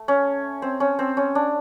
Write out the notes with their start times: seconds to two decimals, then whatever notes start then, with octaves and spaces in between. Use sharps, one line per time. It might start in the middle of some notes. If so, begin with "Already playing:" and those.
Already playing: A3
0.08 C#4
0.62 C4
0.80 C#4
0.99 C4
1.17 C#4
1.35 D4